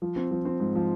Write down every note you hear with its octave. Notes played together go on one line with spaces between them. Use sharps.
F3
C4
F3
C4
G#2
F3